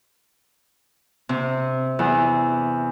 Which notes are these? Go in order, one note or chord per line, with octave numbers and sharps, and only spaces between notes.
C3
E2